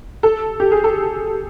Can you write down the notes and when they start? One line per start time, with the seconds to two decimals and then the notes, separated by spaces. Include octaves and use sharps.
0.23 A4
0.60 G4
0.72 G#4
0.84 A4